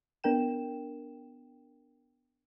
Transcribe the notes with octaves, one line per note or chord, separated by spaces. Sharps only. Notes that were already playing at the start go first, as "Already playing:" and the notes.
B3 D4 A#4 G5 E7